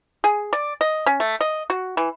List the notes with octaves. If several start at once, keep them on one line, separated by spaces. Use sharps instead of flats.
G#4
D5
D#5
C#4
A3
D#5
F#4
E3